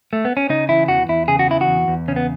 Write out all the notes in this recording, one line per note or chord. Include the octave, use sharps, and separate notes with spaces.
A3
B3
C#4
C#3 D#4
E3 E4
E2 F#4
E2 E4
C#3 G#4
F#4
E3 E4
F#4
E2
E2
C#3 C#4
B3